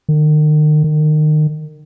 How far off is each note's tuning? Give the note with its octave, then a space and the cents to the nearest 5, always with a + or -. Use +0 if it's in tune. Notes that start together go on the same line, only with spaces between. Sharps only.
D#3 -40
D#3 -30